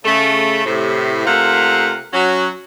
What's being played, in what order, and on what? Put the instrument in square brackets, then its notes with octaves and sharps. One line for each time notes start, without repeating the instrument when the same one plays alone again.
[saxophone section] C#3 A3
A2 C3
C3 A3 A#3 F4 F5 F#5
F#3 C#4 F#4